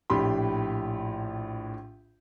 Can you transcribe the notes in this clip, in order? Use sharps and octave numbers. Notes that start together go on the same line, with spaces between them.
A#1 A2 G4 B5 C6